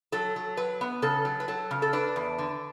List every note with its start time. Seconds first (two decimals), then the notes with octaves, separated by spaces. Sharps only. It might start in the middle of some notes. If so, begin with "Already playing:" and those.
0.12 F#3 A4
0.36 F#3
0.57 F#3 B4
0.81 B3
1.02 C#3 A4
1.25 F#3
1.40 B4
1.48 F#3 A4
1.71 C#3
1.82 A4
1.93 D4 B4
2.16 E2
2.38 D3